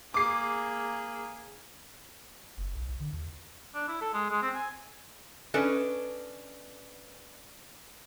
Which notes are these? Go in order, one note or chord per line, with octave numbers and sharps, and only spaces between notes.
A#3 G#4 D6 C7
F#1
B1
B1
D3
D#2
D4
E4
A4
G#3
G#3
C4
G#5
C#4 D4 A4 B4 D#5